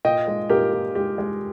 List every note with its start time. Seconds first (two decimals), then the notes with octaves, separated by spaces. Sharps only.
0.05 A#2 D#5 G5
0.27 G#3
0.50 A#2 G4 A#4
0.73 A#2
0.95 G#3 G4
1.18 G#3